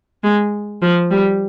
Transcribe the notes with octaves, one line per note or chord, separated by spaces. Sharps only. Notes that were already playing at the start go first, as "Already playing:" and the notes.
G#3
F3
G3